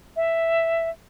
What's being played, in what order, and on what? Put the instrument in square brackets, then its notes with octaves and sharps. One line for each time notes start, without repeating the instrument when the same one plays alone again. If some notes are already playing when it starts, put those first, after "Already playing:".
[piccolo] E5